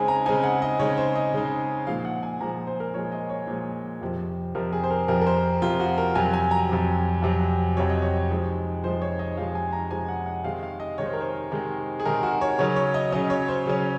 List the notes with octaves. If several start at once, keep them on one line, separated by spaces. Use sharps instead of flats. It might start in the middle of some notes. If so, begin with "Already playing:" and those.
Already playing: C#3 G#3 C4 D#4 G#5
A#5
C#3 G#3 C4 D#4 G#5
F#5
D#5
C#3 G#3 C4 D#4 C#5
C5
D#5
C#3 G#3 C4 D#4
A#2 F3 G#3 F5
F#5
G#5
A#2 F3 G#3 A#5
C5
A#4
A#2 F3 G#3 C#5
D#5
C#5
A#2 F3 G#3
F2 C3 F3
F2 C3 F3 A#4
G#4
C5
A#4
F2 C3 F3 A#4
A#4
C5
F2 C3 F3 F4
F#4
A#4
F2 C3 F#3 G#5
G#5
A#5
F2 C3 F#3
F2 C3 F#3
F2 C3 F#3 C#5
D#5
C#5
C3 F3 G#3 D#4
C3 F3 G#3 D#4 C5
C#5
D#5
C3 F3 G#3 D#4 F5
G#5
A#5
C3 F3 G#3 D#4 G#5
F#5
F#5
C3 D#3 G#3 F5
F5
D#5
C3 D#3 G#3 C#5
C5
A#4
C5
C3 D#3 G#3
G#4
C3 D#3 G#3 A#4
F#4
C#5
C#3 F#3 C#4 C#5
C#5
D#5
C#3 F#3 C#4 D#5
C#5
C5
C#3 F#3 C#4